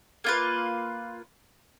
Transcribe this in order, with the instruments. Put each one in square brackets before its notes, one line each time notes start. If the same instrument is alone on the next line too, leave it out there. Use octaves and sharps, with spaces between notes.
[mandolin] A#3 F4 B4